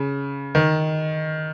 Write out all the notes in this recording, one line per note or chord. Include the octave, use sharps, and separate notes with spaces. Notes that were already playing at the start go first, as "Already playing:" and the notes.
Already playing: C#3
D#3